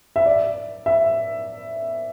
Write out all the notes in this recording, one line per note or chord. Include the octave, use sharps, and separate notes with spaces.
E5
D5
E5